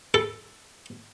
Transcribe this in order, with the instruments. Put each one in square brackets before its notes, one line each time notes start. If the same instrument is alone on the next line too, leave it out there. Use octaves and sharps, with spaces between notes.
[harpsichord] A4